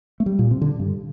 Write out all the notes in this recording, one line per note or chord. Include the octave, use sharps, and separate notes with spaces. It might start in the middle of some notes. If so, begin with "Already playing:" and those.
A3
G3
A#2
C3
D3
G2